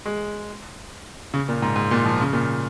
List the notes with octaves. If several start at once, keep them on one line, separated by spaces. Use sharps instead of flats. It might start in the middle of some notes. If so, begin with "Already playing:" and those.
G#3
C#3
A#2
G#2
G#2
A#2
F3
C#3
A#2